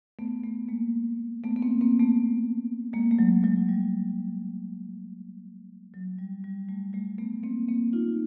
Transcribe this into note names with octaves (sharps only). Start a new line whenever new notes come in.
A3 B3
A3 B3
G#3 A#3
A3 B3
B3
A#3 C4
A#3 C4
A3 B3
G#3 A#3
A3
F#3 G#3
F#3 G#3
G3
F#3
G3
G3
G3 A3
G3 A3
A3 B3
A#3 C4
A#3 C4
D#4 F4